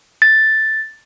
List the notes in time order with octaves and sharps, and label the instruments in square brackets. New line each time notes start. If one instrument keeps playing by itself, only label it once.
[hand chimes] A6